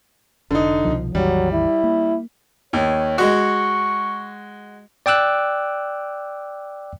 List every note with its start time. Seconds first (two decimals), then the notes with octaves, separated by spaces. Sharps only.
0.51 F1 D3 D#4
0.85 C2 B2 F3
1.15 A1 E2 D#3 F#3 G3
1.53 E4
1.84 A#3
2.73 D#2 C#5
3.18 G#3 F#4 C#6
5.06 D5 G5 D6 E6 F#6